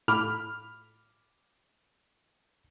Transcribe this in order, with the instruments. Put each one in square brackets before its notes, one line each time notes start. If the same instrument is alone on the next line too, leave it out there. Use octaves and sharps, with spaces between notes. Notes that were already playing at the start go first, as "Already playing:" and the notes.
[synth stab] A2 F6 [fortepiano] B5 D6